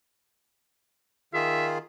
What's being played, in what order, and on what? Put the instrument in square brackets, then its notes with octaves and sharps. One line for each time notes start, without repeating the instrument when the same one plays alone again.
[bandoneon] D#3 F4 G#4 [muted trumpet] E5